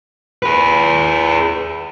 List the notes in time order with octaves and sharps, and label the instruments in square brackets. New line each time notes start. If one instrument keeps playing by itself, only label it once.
[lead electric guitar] G#4 B4